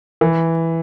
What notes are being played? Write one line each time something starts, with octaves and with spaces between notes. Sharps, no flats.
E3